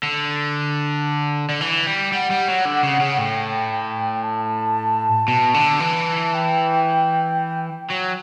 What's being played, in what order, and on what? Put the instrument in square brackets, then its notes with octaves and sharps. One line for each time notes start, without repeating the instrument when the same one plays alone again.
[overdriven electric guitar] D3
D3
E3
G3
[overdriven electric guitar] G3 [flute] F#5
[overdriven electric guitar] G3
F#3
D3
C#3
C#3
[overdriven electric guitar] A2 [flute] G5
[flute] A5
[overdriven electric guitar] B2
D3
E3
[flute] G5
[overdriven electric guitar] F#3